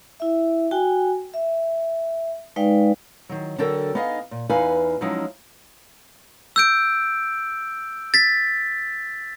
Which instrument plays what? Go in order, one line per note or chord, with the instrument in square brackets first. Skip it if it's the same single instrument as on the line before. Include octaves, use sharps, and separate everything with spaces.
[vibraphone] E4 E5
F#4 G5 G#5
E5
G#3 D#4 B4 D5 F5 G5
[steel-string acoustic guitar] D#3 F#3
D3 F#3 A4 A#4 G5 A5
B3 D#4 G#4 D#5 F5
A#2
E2 D#4 B4 F5 G#5
F3 F#3 G#3 C#4 D#4 E4
[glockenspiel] E6 G6 D7
A6 B6